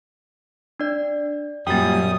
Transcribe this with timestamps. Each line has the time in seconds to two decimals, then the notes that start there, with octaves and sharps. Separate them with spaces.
0.80 D4 D5
1.67 F#2 A#2 G3 G5 D#6 A6